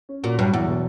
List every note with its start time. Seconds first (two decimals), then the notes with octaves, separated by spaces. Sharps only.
0.09 C#4
0.23 A#2 F#4
0.38 G2 F#3
0.53 E2 F#3
0.67 B2